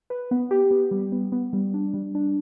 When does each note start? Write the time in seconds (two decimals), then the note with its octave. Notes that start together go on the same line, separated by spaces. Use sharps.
0.10 B4
0.31 B3
0.51 G4
0.71 B3
0.91 G3
1.12 B3
1.32 B3
1.53 G3
1.74 D4
1.94 G3
2.15 D4